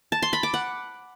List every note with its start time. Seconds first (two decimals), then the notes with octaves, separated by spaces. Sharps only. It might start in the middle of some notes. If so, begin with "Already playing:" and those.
0.12 A5
0.22 C6
0.33 B5
0.43 D6
0.54 F#5